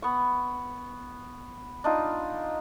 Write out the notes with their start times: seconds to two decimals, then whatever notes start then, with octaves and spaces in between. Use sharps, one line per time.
0.02 B3 C#6
1.84 D4 D#4 F4